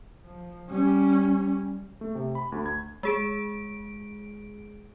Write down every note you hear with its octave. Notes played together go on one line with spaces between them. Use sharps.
F3
G3 C#4
A3
C3
B5
D2
G#6
G#3 G#4 D7